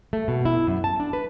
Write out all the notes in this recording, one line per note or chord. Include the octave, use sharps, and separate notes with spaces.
A3
B2
E4
F#2
A5
D4
B4